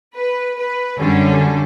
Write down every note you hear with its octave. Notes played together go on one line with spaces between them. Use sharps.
B4
B4
F#2 D3 G3 C#4 A4